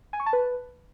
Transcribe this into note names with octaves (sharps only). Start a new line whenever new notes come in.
G#5
C#6
A5
B4